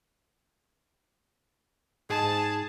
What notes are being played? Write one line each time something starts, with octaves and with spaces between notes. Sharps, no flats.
G#2 G#4 A5